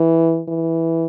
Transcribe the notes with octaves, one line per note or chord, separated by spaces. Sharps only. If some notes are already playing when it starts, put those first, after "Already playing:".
Already playing: E3
E3